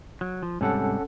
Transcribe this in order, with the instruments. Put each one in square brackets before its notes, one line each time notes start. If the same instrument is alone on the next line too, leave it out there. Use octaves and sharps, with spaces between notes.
[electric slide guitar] F#3
F3
[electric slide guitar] G#2 C3 G3 [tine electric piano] C#4 A4 F#5